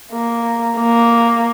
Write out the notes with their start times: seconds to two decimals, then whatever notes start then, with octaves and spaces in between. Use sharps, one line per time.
0.13 A#3
0.79 A#3